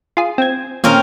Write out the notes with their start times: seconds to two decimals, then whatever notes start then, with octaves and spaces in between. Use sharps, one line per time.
0.17 F4 G#4
0.38 C4 G#6
0.84 A#2 C4 C#4 A#4